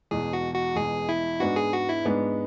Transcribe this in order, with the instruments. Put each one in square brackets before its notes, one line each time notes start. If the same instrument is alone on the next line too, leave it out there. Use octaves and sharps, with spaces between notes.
[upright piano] E2 B2 G#3 [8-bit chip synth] G#4
[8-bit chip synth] F#4
F#4
[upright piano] E2 B2 G#3 [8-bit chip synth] G#4
[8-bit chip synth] E4
[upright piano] G#2 G#3 B3 D4 [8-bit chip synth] F#4
[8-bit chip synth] G#4
F#4
E4
[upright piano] G#2 G#3 B3 D4